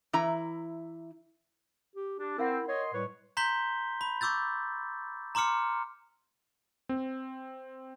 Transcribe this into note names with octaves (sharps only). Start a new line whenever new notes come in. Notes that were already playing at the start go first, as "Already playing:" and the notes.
E3 E4 A#5
G4
D4 G4
C4 E4 A#4 F5 F#5
C#5 D#5 C6
A2 G3 B4 C#5
A#5 C6 G6 B6 G7
B5
C#6 D6 E6 G6 A6
A#5 C6 D6 F6 C#7
C4